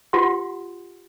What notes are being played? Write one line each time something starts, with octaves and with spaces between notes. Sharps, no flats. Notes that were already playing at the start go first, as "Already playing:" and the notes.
F4 G4 F#5 C6